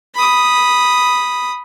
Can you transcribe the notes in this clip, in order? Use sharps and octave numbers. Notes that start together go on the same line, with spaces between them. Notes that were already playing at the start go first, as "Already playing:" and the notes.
B5 D#6